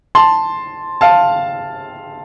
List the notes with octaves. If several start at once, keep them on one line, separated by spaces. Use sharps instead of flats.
A5 C6
F5 A5